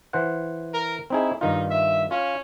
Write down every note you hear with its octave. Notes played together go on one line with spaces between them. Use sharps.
E3 C5 F#5
A#4
C4 D#4 E4 G#4
G2 D#3 D#4 F4
E5
C#4 F4